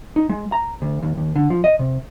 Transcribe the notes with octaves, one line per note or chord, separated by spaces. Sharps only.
D#4
G#3
A#5
D2
D#2
D#2
D3
F3
D#5
C3